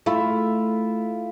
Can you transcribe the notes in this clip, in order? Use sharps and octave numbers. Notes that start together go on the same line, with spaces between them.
A3 E4 F4 E5